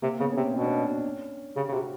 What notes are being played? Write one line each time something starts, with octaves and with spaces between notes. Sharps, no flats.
C3 A#3
C#3 B3
C#4
C3 C4
B2 C#4
D4
C#4
C#3 G4
C#3
C3 F#4